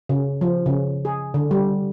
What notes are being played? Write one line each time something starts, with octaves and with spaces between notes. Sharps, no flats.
C#3
F3
C#3
G#4
D3
G3